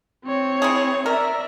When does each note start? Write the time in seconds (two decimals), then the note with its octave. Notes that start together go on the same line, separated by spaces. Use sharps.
0.25 C4 C#5
0.62 E4 G#4
1.06 A#4 D5 E5